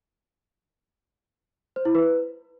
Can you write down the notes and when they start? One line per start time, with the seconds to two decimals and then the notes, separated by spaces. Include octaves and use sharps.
1.76 C5
1.85 E4
1.95 B4